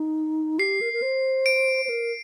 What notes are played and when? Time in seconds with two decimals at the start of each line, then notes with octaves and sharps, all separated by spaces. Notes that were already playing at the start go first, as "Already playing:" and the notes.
Already playing: D#4
0.59 G4 C7
0.81 A#4
0.93 A#4
1.02 C5
1.46 D7
1.85 C5
1.89 A#4